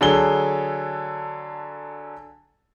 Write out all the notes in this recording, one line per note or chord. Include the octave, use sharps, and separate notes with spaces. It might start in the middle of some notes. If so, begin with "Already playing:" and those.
D3 F#3 G#4 A4 G7